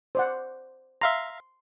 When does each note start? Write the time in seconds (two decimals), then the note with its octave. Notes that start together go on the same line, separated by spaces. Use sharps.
0.15 C5 D5 F#5
1.01 E5 F5 A#5 C6